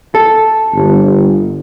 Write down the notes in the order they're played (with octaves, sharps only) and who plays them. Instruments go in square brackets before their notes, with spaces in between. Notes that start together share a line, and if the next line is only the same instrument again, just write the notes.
[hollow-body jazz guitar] A4
[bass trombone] G1